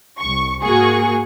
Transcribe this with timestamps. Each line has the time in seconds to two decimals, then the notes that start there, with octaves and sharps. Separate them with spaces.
0.20 C2 C#6
0.63 G#2 A#3 F#4 G#4 C#6